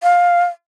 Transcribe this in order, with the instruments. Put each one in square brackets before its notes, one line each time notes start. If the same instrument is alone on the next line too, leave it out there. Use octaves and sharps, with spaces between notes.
[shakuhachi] F5